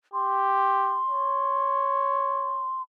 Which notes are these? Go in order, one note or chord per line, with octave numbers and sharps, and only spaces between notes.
G4 C6
C#5